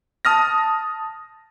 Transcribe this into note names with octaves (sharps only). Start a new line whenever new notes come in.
A5 D#6 F6 A#6